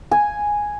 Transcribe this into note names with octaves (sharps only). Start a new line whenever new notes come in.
G#5